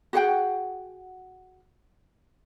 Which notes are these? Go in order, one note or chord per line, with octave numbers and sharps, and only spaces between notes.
F#4 G#4 F#5 G5